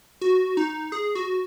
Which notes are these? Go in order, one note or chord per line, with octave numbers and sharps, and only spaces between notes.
F#4
D#4
G#4
F#4